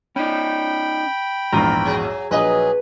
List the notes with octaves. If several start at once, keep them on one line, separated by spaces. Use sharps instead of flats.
C#4 D#4 G5 B5
A#1 E2 G#2 F4 A#5
F#3 G#4
A#1 F#3 G#4 B4 D#5